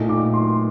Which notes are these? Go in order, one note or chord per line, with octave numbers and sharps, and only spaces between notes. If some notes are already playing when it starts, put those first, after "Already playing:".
Already playing: A#2 A3 D#4
D6
C6